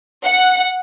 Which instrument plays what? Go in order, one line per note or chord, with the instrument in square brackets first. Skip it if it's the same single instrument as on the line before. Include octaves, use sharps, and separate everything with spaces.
[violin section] F#5